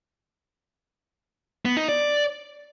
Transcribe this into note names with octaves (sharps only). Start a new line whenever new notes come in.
B3
D#4
D5